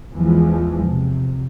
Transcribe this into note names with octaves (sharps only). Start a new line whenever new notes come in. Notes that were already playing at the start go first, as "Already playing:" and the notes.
E2 E3 F3 G#3
C3